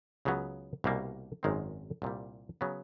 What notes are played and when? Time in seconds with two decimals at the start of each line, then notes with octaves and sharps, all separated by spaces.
0.25 C#2 C#3 F#3 B3
0.84 C2 B2 G3 A#3
1.43 G#1 F#2 D#3 G#3 C4
2.02 C2 A#2 G3
2.61 C#3 F#3 B3